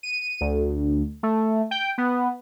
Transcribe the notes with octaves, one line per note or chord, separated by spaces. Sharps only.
D#7
D2
A3
G5
B3